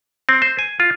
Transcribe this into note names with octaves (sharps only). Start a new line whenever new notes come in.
C4
C5
G#5
F4